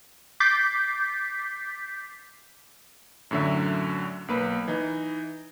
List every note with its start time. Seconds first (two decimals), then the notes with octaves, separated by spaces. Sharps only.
0.40 D6 G6 A6 B6 C7
3.31 F#2 A2 D3 F#3 E5
4.28 B1 A#3 B4
4.68 E3 D#4